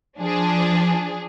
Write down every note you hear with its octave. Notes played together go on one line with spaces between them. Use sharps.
F3 D4 G#4